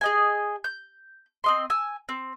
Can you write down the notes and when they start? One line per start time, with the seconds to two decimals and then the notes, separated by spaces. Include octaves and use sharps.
0.01 G#4 D#5 G#5
0.64 G6
1.44 C4 D#5 C6
1.70 G#5 E6
2.09 C4